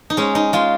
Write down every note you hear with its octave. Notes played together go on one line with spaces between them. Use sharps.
D#4
G#3 C#4
D#4
G#3 F4